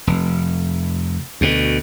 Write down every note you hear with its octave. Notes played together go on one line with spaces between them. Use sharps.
F1
D2 B2